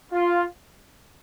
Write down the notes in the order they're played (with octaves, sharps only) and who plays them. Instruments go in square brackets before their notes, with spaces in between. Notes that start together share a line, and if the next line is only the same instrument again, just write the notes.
[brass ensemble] F4